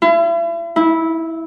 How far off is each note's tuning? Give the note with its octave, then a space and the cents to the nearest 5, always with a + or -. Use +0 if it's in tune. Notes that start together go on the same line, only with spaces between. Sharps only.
E4 +40
E4 -15